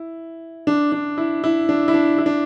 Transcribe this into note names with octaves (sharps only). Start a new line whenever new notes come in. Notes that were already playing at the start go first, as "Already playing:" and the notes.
Already playing: E4
D4
D4
E4
E4
D4
E4
D4
E4
D4